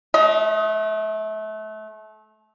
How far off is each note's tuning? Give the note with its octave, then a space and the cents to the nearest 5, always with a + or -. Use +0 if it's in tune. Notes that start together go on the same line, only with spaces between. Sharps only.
A3 -30 D#5 +25